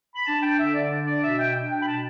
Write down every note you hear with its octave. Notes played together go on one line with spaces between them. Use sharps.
B5
D4 A5
G5
D3 E5
D5
D4
D5
B2 E5
G5
D4 G5
G5
B5
B2 A5